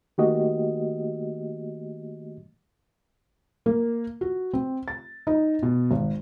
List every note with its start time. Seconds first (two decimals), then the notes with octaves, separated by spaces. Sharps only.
0.18 D#3 A3 A#3 F#4 G4 D#5
3.66 A#3
4.21 F#4
4.53 C4
4.88 A6
5.27 D#4
5.63 B2
5.91 G#1